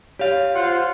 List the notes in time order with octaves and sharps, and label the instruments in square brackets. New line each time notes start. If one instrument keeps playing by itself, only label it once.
[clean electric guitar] G4 F5 [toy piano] C#5
[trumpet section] F4 C5 F#5 [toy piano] D#5